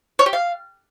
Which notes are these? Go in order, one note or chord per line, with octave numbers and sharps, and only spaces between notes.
C#5
G4
F5